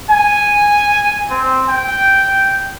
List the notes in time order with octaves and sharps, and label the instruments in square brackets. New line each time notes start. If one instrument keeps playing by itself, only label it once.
[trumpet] G#5
C4
G5